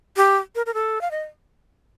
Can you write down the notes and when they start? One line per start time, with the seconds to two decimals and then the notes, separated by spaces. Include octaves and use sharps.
0.16 G4
0.55 A#4
0.66 A#4
0.74 A4
1.01 F5
1.11 D#5